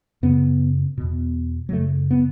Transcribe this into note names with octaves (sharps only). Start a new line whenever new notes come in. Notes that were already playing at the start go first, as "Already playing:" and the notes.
F#2 C#3 B3
E2 B2
F#3
F#2 C#3 A3
B3